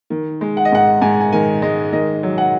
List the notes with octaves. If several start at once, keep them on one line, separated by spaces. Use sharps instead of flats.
D#3
G#3
F#5
D#5
G#2 F#5
G#2 G#5
G#5
D#3 G#5
G#3 D#5
D#3 D#5
F#3
F#5